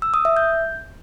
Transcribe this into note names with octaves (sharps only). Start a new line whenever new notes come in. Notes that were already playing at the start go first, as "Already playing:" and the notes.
E6
D#6
E5
G6